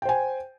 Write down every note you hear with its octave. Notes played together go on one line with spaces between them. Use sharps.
C5 G5 G#5